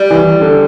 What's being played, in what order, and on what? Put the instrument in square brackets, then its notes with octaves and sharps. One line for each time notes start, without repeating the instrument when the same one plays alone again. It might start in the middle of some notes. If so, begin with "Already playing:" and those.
Already playing: [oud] G3
[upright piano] E3
D3